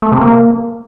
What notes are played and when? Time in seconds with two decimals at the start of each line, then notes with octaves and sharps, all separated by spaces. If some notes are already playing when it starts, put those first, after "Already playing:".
0.02 A3
0.12 C3
0.21 A#3